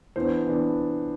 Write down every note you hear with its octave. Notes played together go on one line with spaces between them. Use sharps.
E3 B3 D4 C5
E3 B3 D4